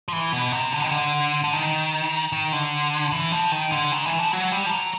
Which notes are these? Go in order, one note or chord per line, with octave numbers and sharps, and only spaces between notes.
F3
E3
B2
C3
D3
D#3
D3
D3
D#3
D#3
D3
E3
F3
D#3
D3
D#3
E3
F3
F#3
G3
F3
F#3